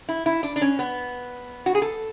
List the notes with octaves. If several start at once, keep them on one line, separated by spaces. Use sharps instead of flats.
E4
E4
D4
D4
C#4
B3
F#4
G#4
A4